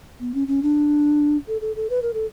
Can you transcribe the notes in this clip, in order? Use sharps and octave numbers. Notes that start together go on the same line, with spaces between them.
B3
C#4
C#4
D4
A4
A4
A4
B4
A#4
A4